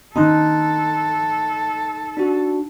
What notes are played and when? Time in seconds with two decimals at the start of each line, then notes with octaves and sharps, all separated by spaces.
0.16 D#3 A#3 C#4 D#4 A4 A#5 C6 F#6
2.17 D4 F#4